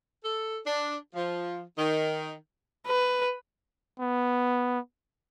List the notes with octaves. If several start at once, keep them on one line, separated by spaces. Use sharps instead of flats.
A4
D4
F3
D#3
B4
B3